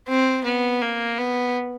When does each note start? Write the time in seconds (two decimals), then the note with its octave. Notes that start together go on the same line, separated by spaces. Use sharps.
0.08 C4
0.44 B3
0.81 A#3
1.18 B3